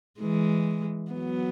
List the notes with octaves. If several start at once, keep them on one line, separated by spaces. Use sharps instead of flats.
E3 G#3
F#3 B3